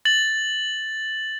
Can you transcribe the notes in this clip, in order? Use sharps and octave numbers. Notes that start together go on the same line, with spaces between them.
A6 F#7